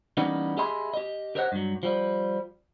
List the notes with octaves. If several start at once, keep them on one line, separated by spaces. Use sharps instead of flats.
E3 G3 A#3 B3 C#4 D#4
G4 G#4 D#5 E5 B5 C6
G4 D#5
G4 A#4 C5 C#5 D#5 F#5
G2 F#3
F3 G3